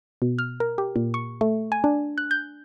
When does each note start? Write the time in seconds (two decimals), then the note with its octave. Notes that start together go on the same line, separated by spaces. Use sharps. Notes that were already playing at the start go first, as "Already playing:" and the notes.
0.22 B2
0.38 F6
0.60 A#4
0.78 G4
0.96 A#2
1.14 C#6
1.41 A3
1.72 G#5
1.84 D4
2.18 F#6
2.31 G6